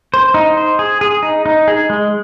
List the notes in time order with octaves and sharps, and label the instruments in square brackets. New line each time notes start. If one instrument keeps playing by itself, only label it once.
[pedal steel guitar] C5
D#4
C5
G#4
G#4
D#4
D#4
G#4
G#3